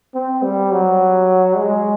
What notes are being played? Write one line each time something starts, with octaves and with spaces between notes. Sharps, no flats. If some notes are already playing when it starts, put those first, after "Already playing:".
C4
G3
F#3
G#3